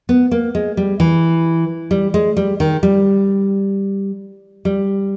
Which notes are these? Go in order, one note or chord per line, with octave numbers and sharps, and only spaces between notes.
B3
A#3
G#3
G3
E3
G3
G#3
G3
D#3
G3
G3